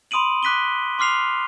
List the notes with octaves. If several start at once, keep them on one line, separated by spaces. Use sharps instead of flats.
B5 C6 D#6 D7 D#7 F#7
D6 F#6 B6 D#7 G7
C6 D6 F6 C7 F7